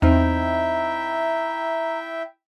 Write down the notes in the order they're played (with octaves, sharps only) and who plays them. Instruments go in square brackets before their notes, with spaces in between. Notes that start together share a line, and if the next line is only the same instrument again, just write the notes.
[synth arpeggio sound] E2 [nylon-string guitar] C4 D#4 [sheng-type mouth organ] E4 E5 G5 [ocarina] A#5